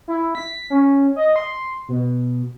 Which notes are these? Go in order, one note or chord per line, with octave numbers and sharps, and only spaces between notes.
E4
B6
C#4
D#5
C6
B2